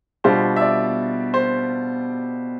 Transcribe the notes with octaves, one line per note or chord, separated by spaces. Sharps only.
B2 G3 D4 F4 C5
E5
D5
C5